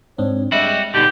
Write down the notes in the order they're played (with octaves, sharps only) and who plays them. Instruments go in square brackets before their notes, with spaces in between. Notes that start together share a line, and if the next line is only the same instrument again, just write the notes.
[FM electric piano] G#2 C4 D4 [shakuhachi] C#5
[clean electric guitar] G3 F#4 [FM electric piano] G#3 E5 [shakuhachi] D#5
[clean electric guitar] B2 D3 [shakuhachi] D#4 [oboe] G4